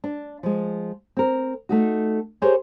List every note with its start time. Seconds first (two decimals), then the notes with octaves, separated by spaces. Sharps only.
0.04 D4
0.43 F3 G#3
1.17 C4 A#4
1.69 A3 D#4 F#4
2.42 G4 G#4 A#4 C5 C#5